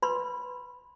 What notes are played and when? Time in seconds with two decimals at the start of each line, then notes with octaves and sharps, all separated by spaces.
0.02 B4 B5 C6